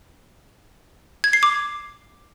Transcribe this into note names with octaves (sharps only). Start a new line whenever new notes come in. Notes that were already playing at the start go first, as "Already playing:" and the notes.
G#6
C7
D6